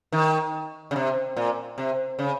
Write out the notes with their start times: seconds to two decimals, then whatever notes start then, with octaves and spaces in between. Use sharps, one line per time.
0.12 D#3
0.91 C#3
0.96 C3
1.37 A#2
1.78 C3
2.19 C#3